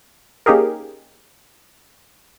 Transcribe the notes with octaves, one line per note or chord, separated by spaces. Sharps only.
A#3 C#4 D#4 G4 G#4 A#4